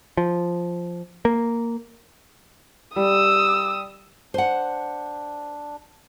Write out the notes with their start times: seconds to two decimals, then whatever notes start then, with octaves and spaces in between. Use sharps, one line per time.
0.17 F3
1.25 A#3
2.96 G3 D#6 E6
4.34 D4 C5 F#5